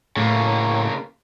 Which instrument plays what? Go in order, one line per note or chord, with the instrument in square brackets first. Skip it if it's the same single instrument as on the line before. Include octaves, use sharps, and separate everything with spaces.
[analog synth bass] A2 [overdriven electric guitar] C#3 A#3